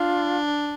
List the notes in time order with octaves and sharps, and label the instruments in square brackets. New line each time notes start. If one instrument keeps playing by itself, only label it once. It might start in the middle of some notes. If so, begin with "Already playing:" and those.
Already playing: [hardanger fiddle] D4 [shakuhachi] F4